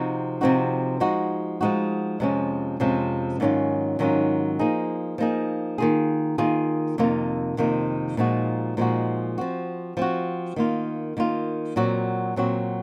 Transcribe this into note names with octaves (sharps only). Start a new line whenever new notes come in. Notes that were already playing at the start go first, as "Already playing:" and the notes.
Already playing: C3 F3 C4 D#4 F#4
C3 F3 C4 D#4 F#4
F3 G#3 D#4 F#4
F3 G#3 D#4 F#4
F2 C3 F3 G#3 C#4
F2 C3 F3 G#3 C#4
G#2 D#3 F#3 C#4 F4
G#2 D#3 F#3 C#4 F4
F3 A#3 D#4 G#4
F3 A#3 D#4 G#4
D#3 A#3 F4 G#4
D#3 A#3 F4 G#4
F2 C3 D#3 A#3 F4
F2 C3 D#3 A#3 F4
A#2 F3 G#3 D#4 F#4
A#2 F3 G#3 D#4 F#4
F3 C4 F#4
F3 C4 F#4
D#3 A#3 F4
D#3 A#3 F4
A#2 F#3 C4 F#4
A#2 F#3 C4 F#4